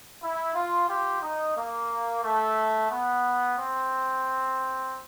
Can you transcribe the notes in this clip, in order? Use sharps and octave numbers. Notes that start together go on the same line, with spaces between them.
E4
F4
F4 G4
D#4
A#3
A3
B3
C4